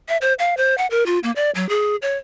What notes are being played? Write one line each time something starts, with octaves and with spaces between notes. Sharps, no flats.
E5
C5
F5
C5
F#5
A#4
F4
A#3
D5
F#3
G#4
C#5